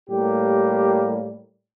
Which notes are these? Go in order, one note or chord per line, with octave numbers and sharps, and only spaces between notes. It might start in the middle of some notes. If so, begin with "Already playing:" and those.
A2 G3 A#3 G4